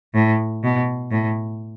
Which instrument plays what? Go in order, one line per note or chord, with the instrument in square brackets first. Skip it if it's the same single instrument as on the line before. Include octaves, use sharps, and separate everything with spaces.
[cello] A2
B2
A2